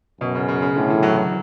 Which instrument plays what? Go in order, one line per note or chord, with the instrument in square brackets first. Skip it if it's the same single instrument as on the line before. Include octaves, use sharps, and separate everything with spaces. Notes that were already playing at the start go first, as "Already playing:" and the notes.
[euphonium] F#2 [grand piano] B2
[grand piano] C#3
C#3
C#3
[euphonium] A2 [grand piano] D3
[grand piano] E3
F#3
F#3